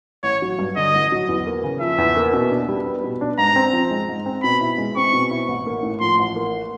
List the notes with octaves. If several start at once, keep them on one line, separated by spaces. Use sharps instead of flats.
A1 C#5
F#3
G2
D3 D#5
A1
F#3
E2
A#3
C#3
F3 E5
E2
A#3
B2
D4
G3
B3
B2
D4
G#2 A#5
C4
F3
G#3
G#2
C4
B2 B5
E4
G#3
C4 C#6
B2
E4
A1
A#3
A2
F3 C6
A1
A#3